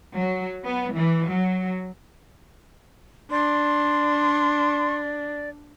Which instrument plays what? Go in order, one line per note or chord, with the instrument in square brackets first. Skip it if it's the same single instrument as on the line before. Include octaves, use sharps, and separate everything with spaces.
[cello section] F#3
B3
E3
F#3
[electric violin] D4 [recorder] D5 [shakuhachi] C6